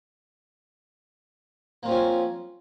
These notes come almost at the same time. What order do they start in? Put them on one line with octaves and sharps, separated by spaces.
A#3 C4 F3 C#4